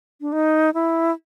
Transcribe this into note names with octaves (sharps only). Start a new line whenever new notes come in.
D4
D#4
E4